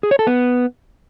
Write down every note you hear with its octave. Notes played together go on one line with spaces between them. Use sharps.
G#4
C#5
A4
B3